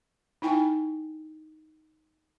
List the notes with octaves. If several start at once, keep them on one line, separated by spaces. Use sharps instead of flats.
D#4 E4 G5 G#5